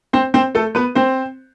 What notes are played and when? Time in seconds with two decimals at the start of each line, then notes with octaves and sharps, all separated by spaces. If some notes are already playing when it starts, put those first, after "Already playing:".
0.13 C4 C5
0.34 C4 C5
0.55 A3 A4
0.75 B3 B4
0.95 C4 C5